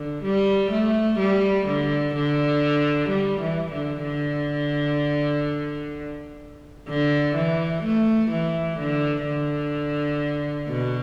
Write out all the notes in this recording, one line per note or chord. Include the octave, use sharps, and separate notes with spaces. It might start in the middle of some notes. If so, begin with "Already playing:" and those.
Already playing: D3
G3
A3
G3
D3
D3
G3
E3
D3
D3
D3
E3
A3
E3
D3
D3
B2